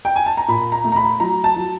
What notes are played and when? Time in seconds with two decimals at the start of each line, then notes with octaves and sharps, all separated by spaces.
0.05 G5
0.16 G#5
0.26 A5
0.37 A#5
0.48 A#2 B5
0.72 A#5
0.84 A3
0.92 A#5
0.96 B5
1.20 F#3 A#5
1.44 A5
1.56 F#3